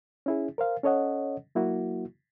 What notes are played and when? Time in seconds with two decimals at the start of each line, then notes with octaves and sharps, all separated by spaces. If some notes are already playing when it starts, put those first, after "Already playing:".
0.26 C#4 E4 G#4
0.58 A#4 C5 F5
0.83 C#4 A4 C#5 D#5 F#5
1.55 F#3 A#3 E4 F#4